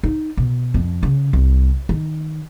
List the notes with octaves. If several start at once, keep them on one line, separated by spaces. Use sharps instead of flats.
D#4
B2
F2
C#3
C2
D#3